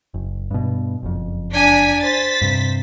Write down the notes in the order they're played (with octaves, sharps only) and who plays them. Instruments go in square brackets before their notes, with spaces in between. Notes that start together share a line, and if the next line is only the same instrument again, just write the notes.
[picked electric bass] F#1
G2 B2
F#1 F2
[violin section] D4 G#5 B6
C5 A6 B6
[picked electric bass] G2 C3